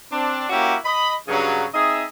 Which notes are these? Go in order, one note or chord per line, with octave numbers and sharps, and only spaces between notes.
C4 D4
A#3 C#4 E4 F#4 G4 A#4
D#5 B5
G2 C#3 F#3
C4 D#4 G#4 D#5 E5